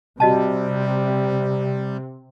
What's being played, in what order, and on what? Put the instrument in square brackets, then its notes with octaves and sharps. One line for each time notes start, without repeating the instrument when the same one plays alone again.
[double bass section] C3 [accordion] G3 [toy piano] F#4 D#5 A5